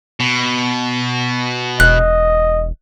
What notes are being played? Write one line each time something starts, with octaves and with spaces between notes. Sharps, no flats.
B2
E1 D#5 F#6